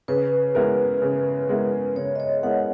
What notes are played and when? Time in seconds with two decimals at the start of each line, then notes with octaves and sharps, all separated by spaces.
0.08 C#3 B4
0.55 G#3 B3 E4 A#4
1.02 C#3
1.49 G#3 B3 E4 A#4
1.96 C#3 C#5
2.15 D#5
2.20 C#5
2.43 G#3 B3 E4 A#4 F#5